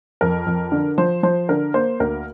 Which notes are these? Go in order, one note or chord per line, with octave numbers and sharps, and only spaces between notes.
F2 A#4
F2
D3
F3 C5
F3 C5
D3 A#4
A#3 C5
D2 A#4